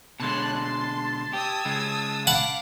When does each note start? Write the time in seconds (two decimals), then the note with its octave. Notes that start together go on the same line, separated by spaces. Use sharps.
0.20 B2 D3 G#3 C#5 A5 C6 F#6
0.56 C6
1.33 G4 D#6 E6 G#6
1.65 C#3 G#3
2.27 F5 F#5 A5 B5 D6